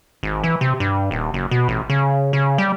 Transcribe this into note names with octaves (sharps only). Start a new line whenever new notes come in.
G#1
E3
C3
G2
D#1
F#1
B2
A1
C#3
C#3
G3